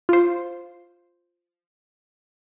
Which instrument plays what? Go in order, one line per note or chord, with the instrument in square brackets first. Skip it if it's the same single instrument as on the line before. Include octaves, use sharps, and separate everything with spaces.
[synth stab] F4 C5